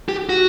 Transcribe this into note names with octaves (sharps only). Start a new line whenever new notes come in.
G4
F#4